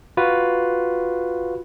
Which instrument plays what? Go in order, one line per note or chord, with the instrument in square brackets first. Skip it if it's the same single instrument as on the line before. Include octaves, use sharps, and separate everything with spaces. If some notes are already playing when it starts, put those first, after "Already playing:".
[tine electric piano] F4 F#4 B4